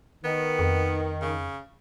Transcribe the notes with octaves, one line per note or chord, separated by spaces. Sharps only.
D#3 B3
F2
C#3